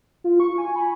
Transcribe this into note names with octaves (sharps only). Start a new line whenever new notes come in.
F4
C#6
G#5
B5